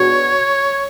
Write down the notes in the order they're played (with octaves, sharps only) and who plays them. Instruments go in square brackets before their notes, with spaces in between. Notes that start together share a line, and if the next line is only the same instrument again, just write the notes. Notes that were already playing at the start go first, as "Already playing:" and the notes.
Already playing: [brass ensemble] B2 G#3 B3 D4 F#4 [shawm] C#5